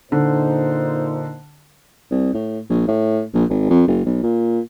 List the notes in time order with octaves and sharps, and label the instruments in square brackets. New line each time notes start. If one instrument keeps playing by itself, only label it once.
[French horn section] A#2 D#4 C5 [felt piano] D3
[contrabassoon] C2
A2
A#1
A2
A#1
G#1
F2
F#1
B1
A#2